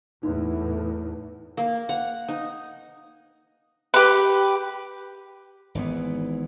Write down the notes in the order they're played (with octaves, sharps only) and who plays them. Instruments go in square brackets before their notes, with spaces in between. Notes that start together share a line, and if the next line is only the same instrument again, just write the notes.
[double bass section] E2 A2 [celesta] D#4
[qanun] A#3
F#5
D#4
[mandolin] G4 B4
[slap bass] G#1 G#2 E3 B3